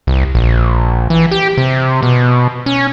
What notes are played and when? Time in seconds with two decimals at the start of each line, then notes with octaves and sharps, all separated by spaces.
0.07 C2
0.35 A#1
1.10 E3
1.31 G4
1.57 C3
2.03 B2
2.66 C#4